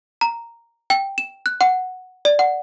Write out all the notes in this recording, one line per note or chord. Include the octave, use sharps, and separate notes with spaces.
A#5
G5
E7
F#6
F#5
D5
F#5